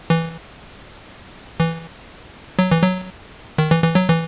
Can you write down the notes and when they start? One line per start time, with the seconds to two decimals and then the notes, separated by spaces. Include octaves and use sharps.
0.10 E3
1.59 E3
2.59 F#3
2.71 E3
2.83 F#3
3.58 D#3
3.71 E3
3.84 E3
3.95 F#3
4.09 E3